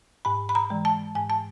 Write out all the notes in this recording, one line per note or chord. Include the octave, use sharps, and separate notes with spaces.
G#2 B5
B5
A#5
E3 G#3
A5
G#2 G#5
A5